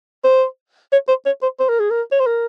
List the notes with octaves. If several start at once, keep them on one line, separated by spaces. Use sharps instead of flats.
C5
C#5
C5
C#5
C5
C5
A#4
G#4
A#4
C#5
C5
A#4